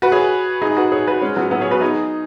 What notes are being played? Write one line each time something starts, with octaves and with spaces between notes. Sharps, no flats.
F#4 B4
G#4 C#5
D#4 G#4
F#4 B4
G#4 C#5
F#4 B4
G#3 C#4
F#3 B3
F#3 B3
G#4 C#5
F#4 B4
D#4 G#4